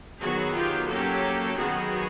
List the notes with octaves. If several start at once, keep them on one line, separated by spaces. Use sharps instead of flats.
D#3 F#3 B3 F#4 G#4
F4 G4
F#3 A#3 C#4 G4 A4
D#3 F#3 B3 F#4 G#4